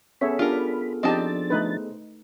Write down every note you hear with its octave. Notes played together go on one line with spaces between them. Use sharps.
B3 C#4 G#4 A4 C#5 E5 B5
D4 F4 G4 A#4
F3 C4 D4 D#4 G4 D#5 A5 A6
A3 D#4 B4